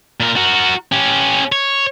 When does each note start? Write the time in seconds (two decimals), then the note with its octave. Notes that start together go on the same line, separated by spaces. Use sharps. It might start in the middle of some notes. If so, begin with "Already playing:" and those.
0.20 A#2 A#4
0.36 F#4 A#4
0.92 C#4 G4
1.52 C#5